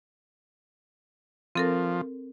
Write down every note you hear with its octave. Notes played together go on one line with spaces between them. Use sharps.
F3 C4 A4 A#4